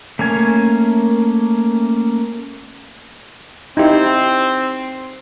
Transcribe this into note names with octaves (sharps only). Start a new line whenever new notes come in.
A3 A#3 C#4 G#5
C4 D#4 E4 G4